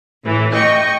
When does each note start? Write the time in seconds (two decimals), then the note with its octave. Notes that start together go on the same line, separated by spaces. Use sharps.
0.23 A2 E3
0.52 D#5 G5 C#6